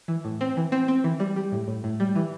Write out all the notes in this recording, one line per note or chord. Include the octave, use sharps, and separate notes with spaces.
E3
A2
C4
E3
C4
C4
E3
G3
G3
A2
A2
A2
G3
E3